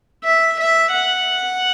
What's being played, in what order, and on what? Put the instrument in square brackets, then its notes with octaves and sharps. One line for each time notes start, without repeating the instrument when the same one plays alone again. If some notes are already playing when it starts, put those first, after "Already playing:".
[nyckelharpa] E5
E5
F#5